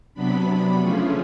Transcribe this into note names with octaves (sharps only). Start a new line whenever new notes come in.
C3 F#3 B3 D4 B5
D3 F3 A3 C#4 F4 G#4